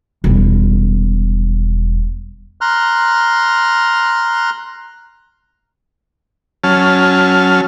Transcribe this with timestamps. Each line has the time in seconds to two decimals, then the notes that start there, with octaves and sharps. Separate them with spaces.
0.24 E1 G3
2.61 A#5 C6 F6 F#6
6.64 F#3 C#4 A5 F6